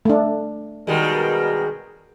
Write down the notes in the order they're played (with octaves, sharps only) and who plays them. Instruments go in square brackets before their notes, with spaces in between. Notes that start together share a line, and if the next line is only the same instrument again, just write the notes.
[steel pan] A3 D4
[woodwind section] B2 A#4 [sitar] D#3 G3 G#3